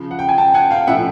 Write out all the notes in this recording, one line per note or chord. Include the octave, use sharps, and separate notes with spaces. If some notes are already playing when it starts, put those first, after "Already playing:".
Already playing: C#3 F3
F#5
G5
G#5
G5 A5
F#5 G#5
F5 G5
A2 F3 E5 F#5